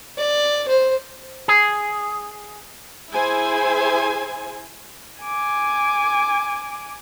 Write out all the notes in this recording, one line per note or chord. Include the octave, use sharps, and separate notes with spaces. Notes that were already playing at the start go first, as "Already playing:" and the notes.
D5
C5
G#4
E4 G#4 C5 G#5
G#5 D6